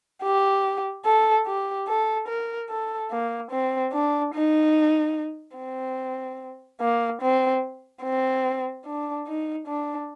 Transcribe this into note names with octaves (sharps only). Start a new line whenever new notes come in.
G4
A4
G4
A4
A#4
A4
A#3
C4
D4
D#4
C4
A#3
C4
C4
D4
D#4
D4